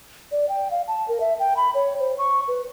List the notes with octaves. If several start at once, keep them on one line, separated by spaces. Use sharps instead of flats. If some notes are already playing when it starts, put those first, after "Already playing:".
D5
G5
F5
A5
A#4
E5
G5
B5
C#5
C5
C#6
B4